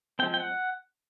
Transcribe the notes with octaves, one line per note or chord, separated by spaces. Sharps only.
F3 G#3 C4 G5
G5
F#5